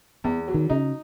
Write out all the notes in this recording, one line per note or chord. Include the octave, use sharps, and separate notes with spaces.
E2 B3
F#3
D#3
C#3 D#4